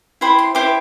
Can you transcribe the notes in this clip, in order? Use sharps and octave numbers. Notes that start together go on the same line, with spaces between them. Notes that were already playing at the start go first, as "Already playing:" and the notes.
E4 G4 C5 B5
C6
E4 G4 C5 D6